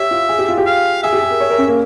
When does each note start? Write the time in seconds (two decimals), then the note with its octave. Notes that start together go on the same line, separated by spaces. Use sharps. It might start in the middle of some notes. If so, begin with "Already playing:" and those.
Already playing: G4 C#5 E5
0.11 F4
0.29 G#4
0.39 G4
0.49 F4
0.58 G4
0.66 F5
1.03 G#4 E5
1.13 G4
1.22 G#4
1.31 A#4
1.40 C#5
1.50 A#4
1.58 C#4
1.68 A#3